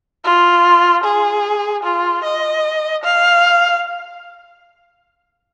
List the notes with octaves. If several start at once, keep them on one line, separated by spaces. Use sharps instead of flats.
F4
G#4
F4
D#5
F5